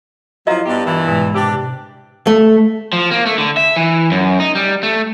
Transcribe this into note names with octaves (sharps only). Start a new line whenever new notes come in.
F3 F#3 E4 D#5 F5 A#5
G2 B3 G4
G2 A#2 E3
G#2 B2 G#3
C3 D4 G4
A3
F3
A#3
A3
D3
E5
E3
F#2
D#4
G3
A3